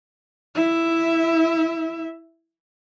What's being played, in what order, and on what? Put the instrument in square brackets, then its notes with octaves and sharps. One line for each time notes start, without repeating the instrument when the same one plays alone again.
[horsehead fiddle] E4 E5